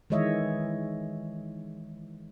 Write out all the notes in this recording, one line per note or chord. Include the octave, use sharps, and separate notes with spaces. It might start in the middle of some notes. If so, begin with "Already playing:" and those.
D#3 E3 G#3 C#5 D#5 E5